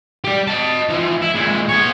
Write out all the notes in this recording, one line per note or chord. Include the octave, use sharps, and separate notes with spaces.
G4 D5
D#5 A5
E3 F3
E4
A#2 G#3
B3 C#5